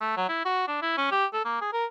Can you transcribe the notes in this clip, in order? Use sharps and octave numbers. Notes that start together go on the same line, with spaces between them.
A3
F#3
E4
F#4
D4
E4
C#4
G4
A4
A#3
G#4
A#4